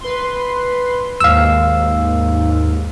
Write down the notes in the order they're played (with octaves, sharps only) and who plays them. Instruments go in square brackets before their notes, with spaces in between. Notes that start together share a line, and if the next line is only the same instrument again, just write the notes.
[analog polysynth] B4 C6
[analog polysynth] D#2 G#2 [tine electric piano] F5 E6